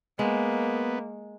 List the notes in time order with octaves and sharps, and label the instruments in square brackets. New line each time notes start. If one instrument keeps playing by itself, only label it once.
[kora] G#3 [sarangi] A#3 [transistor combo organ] B3